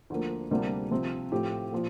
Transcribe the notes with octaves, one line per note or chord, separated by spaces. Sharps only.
D2 D3 F3 A#3
D2 C3 G3 A#3 D4
C3 F3 C4
A2 F3 C4 G4
A#2 F3